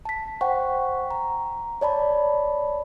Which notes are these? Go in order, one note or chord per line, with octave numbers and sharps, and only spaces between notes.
A5 B6
C5 F#5 G5 C#6
A#5
C#5 D5 A5 B5